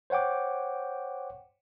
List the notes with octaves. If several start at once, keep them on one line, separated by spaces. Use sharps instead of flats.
C5 C#5 F#5 G5 D6